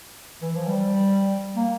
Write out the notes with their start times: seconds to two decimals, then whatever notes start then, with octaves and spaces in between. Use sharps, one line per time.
0.42 E3
0.55 F3
0.67 G3
1.56 A#3